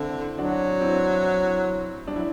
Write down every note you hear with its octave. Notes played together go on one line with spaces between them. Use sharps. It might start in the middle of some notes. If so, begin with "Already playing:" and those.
Already playing: D3 C4 E4
F#3 D4 F#4
C4 E4
G3 D4
F#3 E4